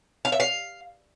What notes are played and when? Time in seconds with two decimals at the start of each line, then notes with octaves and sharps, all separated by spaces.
0.25 F5
0.32 E5
0.40 F5